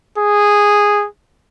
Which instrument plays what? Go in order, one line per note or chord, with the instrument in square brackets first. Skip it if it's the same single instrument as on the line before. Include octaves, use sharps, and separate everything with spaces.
[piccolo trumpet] G#4